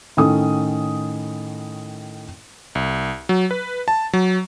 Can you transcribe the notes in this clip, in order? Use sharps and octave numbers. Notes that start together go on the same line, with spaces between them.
A2 D#3 C#4 A4 D#6
C2
F#3
B4
A5
F#3